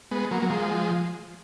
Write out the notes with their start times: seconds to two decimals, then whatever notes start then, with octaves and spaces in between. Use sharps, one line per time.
0.11 G#3 B3
0.31 F#3 A#3
0.42 F#3
0.50 F3 G#3